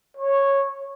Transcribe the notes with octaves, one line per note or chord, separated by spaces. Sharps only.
C#5